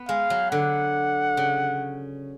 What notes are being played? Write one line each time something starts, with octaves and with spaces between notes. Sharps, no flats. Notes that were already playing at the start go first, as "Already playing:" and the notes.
Already playing: B3
G#3 F5
F#3
D3 F#5
C#3